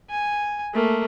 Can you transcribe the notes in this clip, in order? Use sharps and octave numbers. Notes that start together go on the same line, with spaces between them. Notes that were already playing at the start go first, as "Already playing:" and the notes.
G#5
A3 A#3